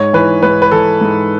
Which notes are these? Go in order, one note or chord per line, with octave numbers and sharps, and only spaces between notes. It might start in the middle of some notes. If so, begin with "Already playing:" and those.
Already playing: G#2 C#5
E3 B4
G#2 B4
B4
E3 A4
G#2